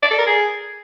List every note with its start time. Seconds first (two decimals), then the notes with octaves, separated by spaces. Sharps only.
0.03 D5
0.11 A4
0.19 A#4
0.27 G#4